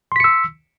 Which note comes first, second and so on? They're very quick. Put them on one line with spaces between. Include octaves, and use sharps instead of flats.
C6 B6 C#7 E6